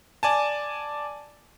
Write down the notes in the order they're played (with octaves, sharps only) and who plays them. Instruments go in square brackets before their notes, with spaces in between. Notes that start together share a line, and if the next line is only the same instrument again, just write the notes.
[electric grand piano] D5 G#5 A5